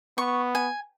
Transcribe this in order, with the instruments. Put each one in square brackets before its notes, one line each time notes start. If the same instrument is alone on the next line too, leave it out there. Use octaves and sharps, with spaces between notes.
[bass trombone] B3 [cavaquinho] C#6
[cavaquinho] G#5